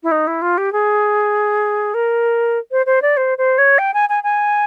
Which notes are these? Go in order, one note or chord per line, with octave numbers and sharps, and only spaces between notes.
E4
D#4
E4
F4
G4
G#4
A#4
C5
C5
D5
C5
C5
C#5
G5
G#5
G#5
G#5